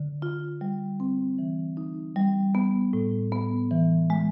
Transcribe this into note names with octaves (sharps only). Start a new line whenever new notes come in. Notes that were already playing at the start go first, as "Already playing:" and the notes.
Already playing: D3
F4
G3
C4
E3
D#4
G3
B3
A2
B3
E3
G#3